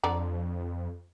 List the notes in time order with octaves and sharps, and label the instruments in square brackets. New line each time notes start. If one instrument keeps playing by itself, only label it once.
[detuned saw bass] F2 [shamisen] D3 D5 A#5